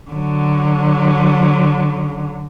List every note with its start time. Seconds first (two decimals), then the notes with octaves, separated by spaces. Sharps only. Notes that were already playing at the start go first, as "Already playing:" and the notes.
0.11 D3 F#3